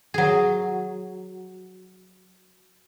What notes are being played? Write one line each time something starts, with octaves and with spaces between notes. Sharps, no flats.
F#3 G#4